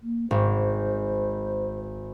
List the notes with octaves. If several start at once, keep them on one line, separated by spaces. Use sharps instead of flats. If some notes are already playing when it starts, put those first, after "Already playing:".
A#3
G#1 C5